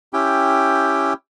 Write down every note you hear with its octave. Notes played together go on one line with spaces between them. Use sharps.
C#4 E4 G4 G5